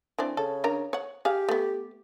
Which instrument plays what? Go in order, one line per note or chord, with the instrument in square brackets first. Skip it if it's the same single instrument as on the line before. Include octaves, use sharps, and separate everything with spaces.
[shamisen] E3 C4 D4
[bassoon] C#3 [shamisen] A4
[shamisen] D4 A#4 A#5
C#5 F#5
[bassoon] G4 [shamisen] G#4 F5
[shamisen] A3 B3